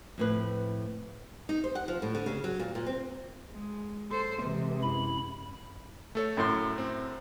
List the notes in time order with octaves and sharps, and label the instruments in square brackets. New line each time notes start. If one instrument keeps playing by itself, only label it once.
[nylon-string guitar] F2 A2 B4
D#4
C5
F#5
F3
A2
D3
C#3
F#3
A#2
A#2
C4
[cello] G#3
A4 C5
[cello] C3 G#3 [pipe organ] E3
[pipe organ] F#2 E4 B5
[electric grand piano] A3 A4 C#5
[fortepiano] F#2 A2 C6
[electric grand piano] C4